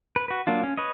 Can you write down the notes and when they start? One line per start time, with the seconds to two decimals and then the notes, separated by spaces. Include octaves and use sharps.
0.16 B4
0.28 F#4 B4
0.47 F#3 A#3 D4 F4
0.63 C#4
0.77 B4 C#5 D#5